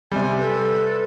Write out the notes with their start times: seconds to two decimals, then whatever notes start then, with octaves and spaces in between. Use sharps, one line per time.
0.12 C3 G3 G#5
0.38 A4 B4